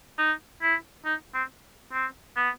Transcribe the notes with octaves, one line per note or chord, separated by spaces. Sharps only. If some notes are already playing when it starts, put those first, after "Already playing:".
D#4
E4
D#4
C4
C4
B3